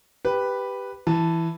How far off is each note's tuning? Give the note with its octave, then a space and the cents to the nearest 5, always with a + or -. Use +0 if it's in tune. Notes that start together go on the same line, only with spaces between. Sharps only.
G4 +5 B4 +0
E3 +5 A5 +0